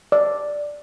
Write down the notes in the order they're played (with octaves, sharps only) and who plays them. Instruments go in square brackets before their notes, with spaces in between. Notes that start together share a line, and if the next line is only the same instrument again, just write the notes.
[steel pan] D5